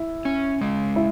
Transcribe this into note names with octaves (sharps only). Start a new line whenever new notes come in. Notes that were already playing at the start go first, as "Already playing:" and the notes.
Already playing: E4
C#4
G#3
E4